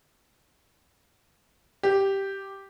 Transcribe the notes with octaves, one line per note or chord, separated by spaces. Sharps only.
G4